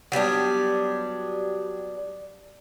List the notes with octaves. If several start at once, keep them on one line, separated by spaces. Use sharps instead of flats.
F#3 G3 B3 D4